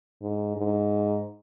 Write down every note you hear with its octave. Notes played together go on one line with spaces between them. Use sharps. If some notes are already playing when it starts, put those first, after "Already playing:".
G#2
G#2